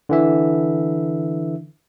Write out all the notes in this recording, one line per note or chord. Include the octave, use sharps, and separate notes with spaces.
D3 E3 E5